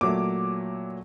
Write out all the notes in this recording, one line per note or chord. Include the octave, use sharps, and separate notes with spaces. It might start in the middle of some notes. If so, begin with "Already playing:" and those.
A#2 F#3 A3 D6